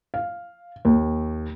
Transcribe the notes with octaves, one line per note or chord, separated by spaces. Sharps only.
F5
D#2